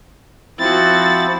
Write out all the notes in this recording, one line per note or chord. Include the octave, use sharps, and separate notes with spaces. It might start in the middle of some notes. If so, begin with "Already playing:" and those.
F3 C4 E4 F#4 A6